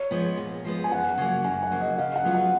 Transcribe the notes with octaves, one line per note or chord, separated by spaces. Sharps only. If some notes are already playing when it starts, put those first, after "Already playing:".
Already playing: C#5
F3 G#3 B3
A#2
F3 G#3 B3
G#5
F#2 F#5
C#3 F#3 A#3
F#2 G#5
F#5
C#3 F#3 A#3
D#5
C#3 F5
F#5
F#3 B3 F4 G#4
F#5